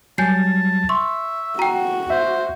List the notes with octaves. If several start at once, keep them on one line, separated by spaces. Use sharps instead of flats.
F#3 G3 G#5 A5 G6 C7
E5 C6 C#6
F#4 G5 A#5
C5 E5